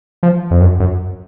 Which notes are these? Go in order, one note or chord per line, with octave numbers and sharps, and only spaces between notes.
F3
F2
F#2
F#2